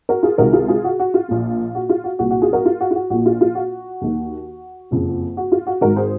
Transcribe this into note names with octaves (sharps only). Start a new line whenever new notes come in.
F#4 A#4
F4 G#4
C#2 C3 D#3 F#4 A#4
F4 G#4
F4 G#4
F#4
F#4
F4
A#1 A#2
F#4
F4
F#4
C2 A#2 F#4
F#4
F4 G#4
F#4 A#4
F4
F#4
F4
F#4
A#1 A#2 F#4
F4
F4
F#4
D#2 D#3
F#1 F2 C#3
F#4
F4
F#4
G#1 G#2 D#3 F#4 A#4
G#4 C5